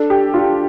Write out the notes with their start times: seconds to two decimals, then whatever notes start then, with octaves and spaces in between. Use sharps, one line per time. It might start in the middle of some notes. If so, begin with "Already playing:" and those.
Already playing: D4 A4
0.10 G4
0.34 D4 F4